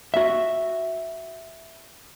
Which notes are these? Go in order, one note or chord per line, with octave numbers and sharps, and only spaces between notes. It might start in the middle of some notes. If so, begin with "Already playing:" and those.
F#4 E5